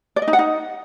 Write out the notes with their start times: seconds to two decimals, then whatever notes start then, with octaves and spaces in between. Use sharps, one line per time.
0.16 D5
0.22 D#5
0.28 D#4
0.33 F#5
0.39 D#4